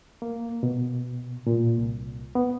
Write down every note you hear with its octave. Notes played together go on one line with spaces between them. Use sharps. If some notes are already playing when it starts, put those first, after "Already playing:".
A#3
B2
A#2
C2
B3